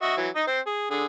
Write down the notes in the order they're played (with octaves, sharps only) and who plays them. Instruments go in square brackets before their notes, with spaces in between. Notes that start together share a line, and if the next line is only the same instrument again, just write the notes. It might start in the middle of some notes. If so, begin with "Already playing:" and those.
[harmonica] F#4 D#5 E5
E3 F#3
D#4 D#5
C4 C5
G#4
D3 G#4